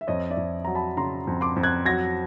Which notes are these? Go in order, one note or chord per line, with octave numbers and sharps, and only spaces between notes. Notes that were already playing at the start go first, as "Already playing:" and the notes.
E5
F2 C#5 D#5
D5 E5
F2
F#3 A#5
A5 B5
C#3 A#5 C6
F2
C6 D6
F2
F#6 G#6
F#3 G#6 A#6